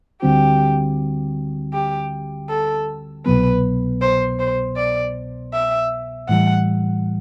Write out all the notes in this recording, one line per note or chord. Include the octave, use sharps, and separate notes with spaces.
D2 D3 G3 C4 F#4 G4
G4
A4
C2 B2 F#3 B3 B4
C5
C5
D5
E5
A2 E3 G3 F#5